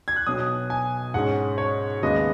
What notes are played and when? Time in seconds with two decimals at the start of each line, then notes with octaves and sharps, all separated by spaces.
0.08 G#6
0.16 F#6
0.26 B1 B2 F#3 D#6
0.70 G#5
1.14 G#2 G#3 C#4 F#5
1.58 C#5
2.02 D#2 C#3 G#3 B3 D#5